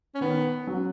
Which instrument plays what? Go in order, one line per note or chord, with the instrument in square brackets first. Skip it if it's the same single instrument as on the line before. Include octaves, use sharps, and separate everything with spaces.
[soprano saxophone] C#4
[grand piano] D#3 [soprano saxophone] B3
[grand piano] F#3 C#4 F#4